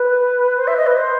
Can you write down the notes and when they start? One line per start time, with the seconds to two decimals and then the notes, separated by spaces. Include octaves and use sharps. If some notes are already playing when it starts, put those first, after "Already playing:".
Already playing: B4
0.57 C5
0.67 E5
0.77 D#5
0.86 B4
0.96 C5